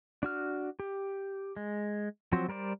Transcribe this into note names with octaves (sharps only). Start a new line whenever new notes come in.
D4 F#4 F6
G4
G#3
F3 F#3 C4 F#4 C5
G3 A#4 C5 D5